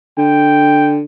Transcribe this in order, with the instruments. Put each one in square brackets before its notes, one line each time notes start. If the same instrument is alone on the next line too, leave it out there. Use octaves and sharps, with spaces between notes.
[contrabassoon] D3 [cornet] G5